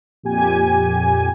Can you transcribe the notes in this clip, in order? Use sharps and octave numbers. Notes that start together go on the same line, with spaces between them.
F2 A#2 G4 G#5